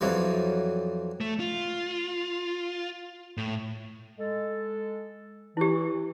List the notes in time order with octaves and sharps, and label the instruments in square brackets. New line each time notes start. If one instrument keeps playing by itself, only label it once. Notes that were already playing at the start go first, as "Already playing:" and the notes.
[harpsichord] F2 E3 F#3 G3
[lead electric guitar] A3
F4
A2
[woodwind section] G#3 A4
[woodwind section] E3 [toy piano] E4 G4